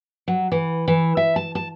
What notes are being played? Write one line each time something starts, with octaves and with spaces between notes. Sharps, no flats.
F#3
E3
E3
E5
A5
A5